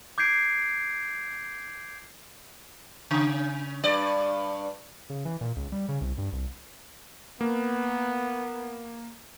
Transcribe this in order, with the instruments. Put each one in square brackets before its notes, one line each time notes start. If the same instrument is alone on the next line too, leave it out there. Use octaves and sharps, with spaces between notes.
[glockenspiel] D6 G6 G#6 C7 D7
[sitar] C#3
G2 D5
[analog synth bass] C#3
E3
A#2
C#2
G3
C#3
C2
G2
C2
[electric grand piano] A#3 [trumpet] B3